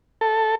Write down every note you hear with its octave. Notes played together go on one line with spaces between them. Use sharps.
A4